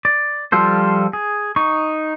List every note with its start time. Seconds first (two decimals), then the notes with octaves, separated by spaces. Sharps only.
0.05 D5
0.52 F3 G3 F4 A4 C5
1.13 G#4
1.56 D#4 C#6